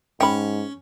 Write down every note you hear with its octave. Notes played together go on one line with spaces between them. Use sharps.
G#2 C#4 G5 B5